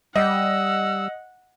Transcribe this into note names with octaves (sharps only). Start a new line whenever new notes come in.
G3 D#5 F#5 E6